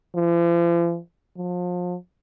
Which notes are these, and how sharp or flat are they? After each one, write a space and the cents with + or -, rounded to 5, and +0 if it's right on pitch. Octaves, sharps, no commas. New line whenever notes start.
F3 -45
F3 +35